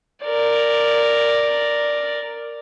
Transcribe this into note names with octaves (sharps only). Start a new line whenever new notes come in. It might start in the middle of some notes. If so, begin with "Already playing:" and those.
A#4 D5